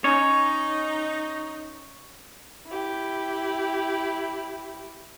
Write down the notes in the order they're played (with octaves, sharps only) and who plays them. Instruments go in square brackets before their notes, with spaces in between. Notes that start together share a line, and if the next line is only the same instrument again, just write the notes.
[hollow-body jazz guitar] C#4 [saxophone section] D#4 [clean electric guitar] C#5
[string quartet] E4 G4